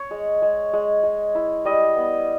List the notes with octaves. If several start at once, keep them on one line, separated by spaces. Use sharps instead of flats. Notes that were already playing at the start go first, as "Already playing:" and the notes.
Already playing: C#5
G#3
G#3
G#3
G#3
E4
G3 D#5
B3